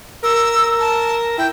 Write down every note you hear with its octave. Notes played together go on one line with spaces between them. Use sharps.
A#4 E6
A5
E4 G5